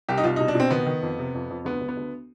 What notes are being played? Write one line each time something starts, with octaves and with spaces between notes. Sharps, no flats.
C2 G4
D#4
C2 F4
B2 D#4
D4
B2 C4
D#3 B3
D#3
F2
C3
F2
F2
D2 B3
D2
B3
D2